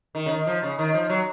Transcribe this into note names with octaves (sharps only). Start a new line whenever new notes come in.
D#3
C#3
D#3
F3
C#3
D#3
F3
F#3